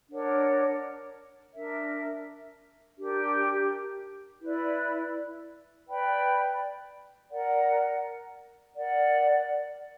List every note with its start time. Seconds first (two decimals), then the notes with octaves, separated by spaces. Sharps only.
0.09 D4 A#4 C#5 F#5
1.54 D4 A#4 E5
2.98 D4 G4 A#4
4.42 E4 B4 D5
5.87 B4 D5 G5 B5
7.31 A#4 D5 F#5
8.76 A#4 D5 F#5